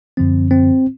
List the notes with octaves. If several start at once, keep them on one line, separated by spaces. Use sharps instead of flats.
F#2 D3 F3 C4
C4